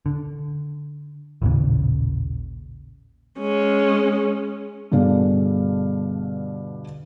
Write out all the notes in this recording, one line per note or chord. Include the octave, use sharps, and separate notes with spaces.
D3
A1 D#2 A#2 C#3
G#3 C#4
G2 B2 D3 D4 G#4 F5